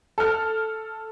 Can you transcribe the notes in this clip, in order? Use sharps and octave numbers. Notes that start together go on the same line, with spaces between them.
A4 F6